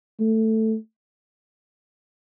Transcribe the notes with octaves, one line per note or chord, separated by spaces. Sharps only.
A3